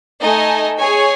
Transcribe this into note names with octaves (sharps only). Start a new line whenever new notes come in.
A3 D#4 A4 D#5 G#5
G#4 C#5 G#5